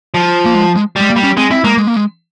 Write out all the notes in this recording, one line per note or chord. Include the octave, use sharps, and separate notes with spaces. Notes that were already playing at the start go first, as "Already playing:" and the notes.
F3
A#3
G#3
G#3
G3 G#3
A#3
G3
C#4
G#3 C4
C4 E4
G#3 A#3
G#3
A#3
G#3